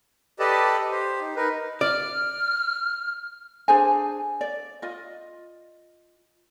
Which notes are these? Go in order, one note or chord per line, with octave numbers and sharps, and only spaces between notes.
G4 A4 B4 D5 D#5 A5
G4 C5
D#4
D#4 A#4 B4
D5 F6
D4 G#4 C5 G#5
D5
F4 D#5